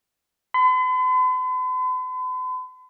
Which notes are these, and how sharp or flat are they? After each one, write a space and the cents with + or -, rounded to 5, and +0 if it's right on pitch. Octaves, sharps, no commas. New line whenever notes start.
B5 +45